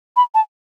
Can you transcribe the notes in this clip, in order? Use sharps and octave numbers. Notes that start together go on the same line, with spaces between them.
B5
A5